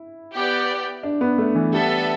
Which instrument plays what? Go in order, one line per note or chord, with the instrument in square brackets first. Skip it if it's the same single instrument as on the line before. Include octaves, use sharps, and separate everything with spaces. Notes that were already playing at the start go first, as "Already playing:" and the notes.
Already playing: [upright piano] E4
[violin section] B3 G4 D5 G5
[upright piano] D4
B3
A3
E3
[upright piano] G3 [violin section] B3 D4 A4 E5